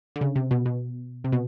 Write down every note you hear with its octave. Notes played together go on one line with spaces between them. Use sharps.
D3
C#3
C3
B2
B2
C3
B2